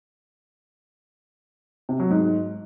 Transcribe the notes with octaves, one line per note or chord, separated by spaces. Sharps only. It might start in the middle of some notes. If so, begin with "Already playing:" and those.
C3
F#3
G#2